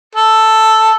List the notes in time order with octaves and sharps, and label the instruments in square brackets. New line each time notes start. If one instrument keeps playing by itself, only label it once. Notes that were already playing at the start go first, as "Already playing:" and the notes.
[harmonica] A4